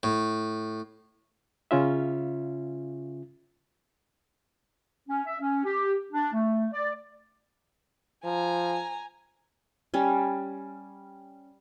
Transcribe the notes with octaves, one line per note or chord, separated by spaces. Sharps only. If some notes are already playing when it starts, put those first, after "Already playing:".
A2
C#3 C#4 F4 E5
C#4
E5
C#4
G4
D4
A3
D5
F3 G#5 A#5
G3 C#4